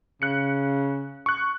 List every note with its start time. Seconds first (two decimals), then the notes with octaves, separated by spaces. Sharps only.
0.22 C#3 F#6 C#7
1.26 C#6 F#6